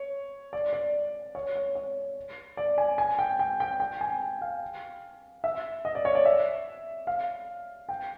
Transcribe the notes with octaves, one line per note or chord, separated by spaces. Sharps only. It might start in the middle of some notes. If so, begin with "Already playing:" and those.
Already playing: C#5
D5
D5
C#5
C#5
C#5
D5
G#5
G#5
G5
G5
G5
G5
G#5
F5
E5
D#5
D5
C#5
D5
E5
F5
G5